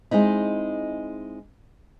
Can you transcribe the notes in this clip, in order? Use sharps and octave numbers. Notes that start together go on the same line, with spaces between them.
G#3 C4 D#4 E4